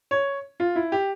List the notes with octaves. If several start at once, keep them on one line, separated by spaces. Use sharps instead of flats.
C#5
F4
E4
G4